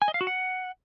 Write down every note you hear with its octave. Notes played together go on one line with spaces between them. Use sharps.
G#5
D#5
F5
F#4
F#5